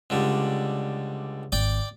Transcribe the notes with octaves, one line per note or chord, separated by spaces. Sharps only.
C#2 D3 G3
G#1 D5 G5 D6